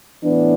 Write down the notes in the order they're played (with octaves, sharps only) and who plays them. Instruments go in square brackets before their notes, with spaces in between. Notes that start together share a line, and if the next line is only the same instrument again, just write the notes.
[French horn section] A2 E3 B3 D4